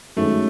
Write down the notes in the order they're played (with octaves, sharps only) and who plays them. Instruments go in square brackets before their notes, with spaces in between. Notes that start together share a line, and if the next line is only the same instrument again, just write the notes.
[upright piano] F#2 D#3 G#3 C#4 [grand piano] A3